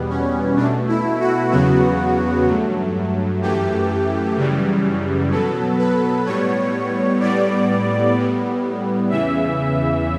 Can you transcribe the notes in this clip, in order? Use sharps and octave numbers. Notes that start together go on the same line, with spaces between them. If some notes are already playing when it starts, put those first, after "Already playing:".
Already playing: E2 B2 G3 B3
C#4
B2 A3 D4
E4
F#4
E2 C#3 F#3 B3 F#4
G2 F#3 A3
F#2 E3 A3 G4
F#2 C#3 E3 G3
B2 F#3 B3 A4
B4
A2 G3 B3 C#5
A2 G3 B3 D5
A2 G3 B3
E2 C#3 E3 E5